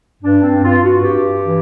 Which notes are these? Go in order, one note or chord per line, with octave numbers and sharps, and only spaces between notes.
G2 D4
C4
G2 F4
F#4
G2 G4
E3